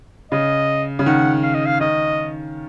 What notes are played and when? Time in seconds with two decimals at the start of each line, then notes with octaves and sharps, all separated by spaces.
0.32 C#3 D#5
0.99 C#3
1.06 D#3 F#5
1.43 F5
1.55 D#5
1.66 F5
1.81 D#3 D#5